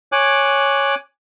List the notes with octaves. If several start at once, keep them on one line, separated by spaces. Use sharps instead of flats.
C#5 G#5 D6 F#6